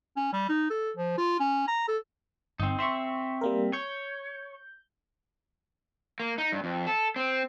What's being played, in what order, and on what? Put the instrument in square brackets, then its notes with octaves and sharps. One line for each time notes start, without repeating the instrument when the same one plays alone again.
[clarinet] C#4
G3
D#4
A4
F3
F4
C#4
A#5
A4
[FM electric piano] G1 [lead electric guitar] C4 D#4
[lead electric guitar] C4 E5 [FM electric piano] C6 C#6
[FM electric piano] G3 A#3 A#4
[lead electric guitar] C#5 [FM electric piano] G6
[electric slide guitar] A#3
D#4
G2
F2
A4
C4